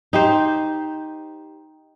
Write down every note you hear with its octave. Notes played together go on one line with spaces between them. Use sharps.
D#4 G4 C5